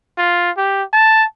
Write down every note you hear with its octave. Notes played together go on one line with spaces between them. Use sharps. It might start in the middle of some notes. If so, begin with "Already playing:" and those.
F4
G4
A5